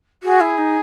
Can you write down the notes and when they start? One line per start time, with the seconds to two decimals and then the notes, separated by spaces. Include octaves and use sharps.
0.23 F#4 G#4
0.41 E4
0.58 D#4